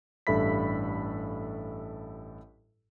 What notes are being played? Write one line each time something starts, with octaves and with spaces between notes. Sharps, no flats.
A1 G2 A4 E5 B5 B6